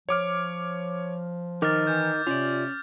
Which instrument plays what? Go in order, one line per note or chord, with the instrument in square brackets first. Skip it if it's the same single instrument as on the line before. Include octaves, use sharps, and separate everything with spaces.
[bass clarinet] F3 [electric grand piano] C#5 D6 F6
[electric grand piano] D#3 [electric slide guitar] D#4 A#4 D#5 [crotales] D6 F6 A6
[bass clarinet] E3 [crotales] G6
[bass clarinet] C3 [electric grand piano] C#4 [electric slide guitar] F4 D5